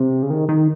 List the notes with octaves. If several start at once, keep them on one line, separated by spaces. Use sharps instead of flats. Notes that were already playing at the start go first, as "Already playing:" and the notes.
Already playing: C3
C#3
D#3
D#3